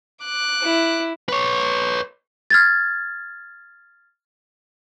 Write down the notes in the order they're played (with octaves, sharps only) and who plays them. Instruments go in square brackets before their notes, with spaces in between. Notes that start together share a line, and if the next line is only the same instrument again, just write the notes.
[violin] D6 F#6
[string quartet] E4
[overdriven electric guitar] B4 C#5
[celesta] F6 G#6 A6